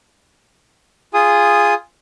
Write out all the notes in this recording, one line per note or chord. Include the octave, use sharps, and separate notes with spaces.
F4 G#4 D#6